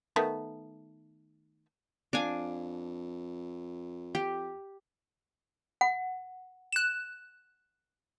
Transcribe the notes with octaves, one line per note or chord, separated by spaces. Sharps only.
D#3 A3 B3
F2 D4 F5 G#5
G4
F#5
F#6 E7